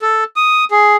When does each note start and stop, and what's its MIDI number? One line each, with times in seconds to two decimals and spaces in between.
0.02 0.24 69
0.36 0.65 87
0.71 0.96 68